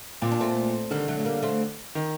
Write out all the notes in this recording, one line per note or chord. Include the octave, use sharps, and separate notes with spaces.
A#2 C4
D4
A3 C4
D3 D#3 G3
F#3 A3
A3
G3 A#3
A3 C4
D#3